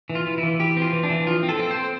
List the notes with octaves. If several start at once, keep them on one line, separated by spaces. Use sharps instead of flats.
E3
F4
E3
E4
E3
E3 G4
C4
F4
E3
D4
E3
F3 F4
C4
A4
C4
C4 C5